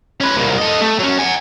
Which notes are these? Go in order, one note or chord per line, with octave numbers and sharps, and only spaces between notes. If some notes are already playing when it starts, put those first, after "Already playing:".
C#4 B4
C2 A#2
A4 D#5
A3
F#3 C#4
F#5 G#5